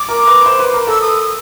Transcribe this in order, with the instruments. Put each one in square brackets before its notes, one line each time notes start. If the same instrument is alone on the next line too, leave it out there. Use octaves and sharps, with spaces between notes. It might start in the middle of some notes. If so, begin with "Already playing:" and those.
Already playing: [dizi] D6
[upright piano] A#4
B4
C5
B4
A#4
[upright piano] A4 [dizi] E6
[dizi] D#6